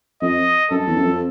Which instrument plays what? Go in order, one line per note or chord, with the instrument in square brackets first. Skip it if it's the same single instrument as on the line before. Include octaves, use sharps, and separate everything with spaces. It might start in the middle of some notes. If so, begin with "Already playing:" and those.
[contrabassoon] F2 [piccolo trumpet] D#5
[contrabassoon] F#2 [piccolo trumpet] A4
[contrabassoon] E2
F#2
F2